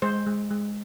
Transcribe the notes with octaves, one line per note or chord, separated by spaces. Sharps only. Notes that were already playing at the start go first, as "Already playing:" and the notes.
G#3 C5
G#3
G#3